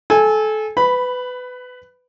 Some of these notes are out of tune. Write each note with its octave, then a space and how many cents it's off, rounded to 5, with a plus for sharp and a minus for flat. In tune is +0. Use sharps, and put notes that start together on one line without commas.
A4 -25 G#5 -10
B4 +20 B5 +0